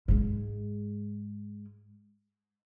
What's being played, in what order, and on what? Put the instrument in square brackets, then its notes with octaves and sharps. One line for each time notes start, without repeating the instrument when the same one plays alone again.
[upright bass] G#2 G#3